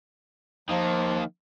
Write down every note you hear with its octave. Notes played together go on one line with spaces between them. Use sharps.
D#3 F3 A#3